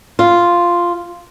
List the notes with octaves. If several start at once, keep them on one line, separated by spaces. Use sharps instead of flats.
F4